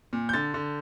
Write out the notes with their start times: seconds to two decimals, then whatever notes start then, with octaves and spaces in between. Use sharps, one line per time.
0.13 A#2
0.29 G6
0.33 D3 A6
0.54 D3